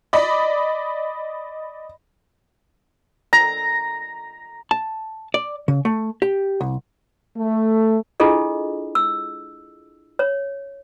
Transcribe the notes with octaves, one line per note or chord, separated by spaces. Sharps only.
D5 D#5 B5
A#5
A5
D5
C#3
A3
G4
C2
A3
D4 E4 F4 G#4 A4 D#5
E6
C#5